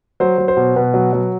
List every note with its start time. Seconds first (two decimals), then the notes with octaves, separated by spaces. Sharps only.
0.20 F#3 C5
0.38 F#3
0.48 C5
0.57 B2
0.76 B2 B4
0.94 F#3
1.13 F#3